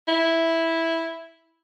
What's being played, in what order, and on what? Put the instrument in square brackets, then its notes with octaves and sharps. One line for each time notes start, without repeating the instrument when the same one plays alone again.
[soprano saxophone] E4